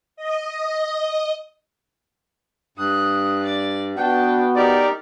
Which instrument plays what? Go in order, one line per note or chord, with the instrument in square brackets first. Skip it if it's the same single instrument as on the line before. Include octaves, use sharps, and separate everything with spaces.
[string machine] D#5
[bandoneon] G2 [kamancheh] D#6 F#6
[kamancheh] D5
[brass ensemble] B3 F#4 [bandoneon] D4 [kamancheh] G5 A5
[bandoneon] D#4 G4 [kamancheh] A#4 [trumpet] D5